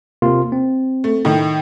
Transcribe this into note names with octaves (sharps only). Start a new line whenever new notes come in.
C3 A#3 F4
C4
A3
A2 D#3